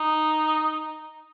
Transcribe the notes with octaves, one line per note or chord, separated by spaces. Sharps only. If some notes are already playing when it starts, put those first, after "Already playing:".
Already playing: D#4